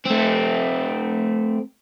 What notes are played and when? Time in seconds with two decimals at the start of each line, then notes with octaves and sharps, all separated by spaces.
0.06 A3 C4